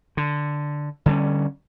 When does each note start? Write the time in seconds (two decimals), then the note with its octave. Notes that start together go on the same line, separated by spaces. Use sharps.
0.17 D3
1.06 D3 G3 C#4